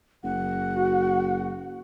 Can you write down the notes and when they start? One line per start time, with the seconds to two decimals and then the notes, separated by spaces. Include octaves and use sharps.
0.24 F#1 F#5
0.77 F#4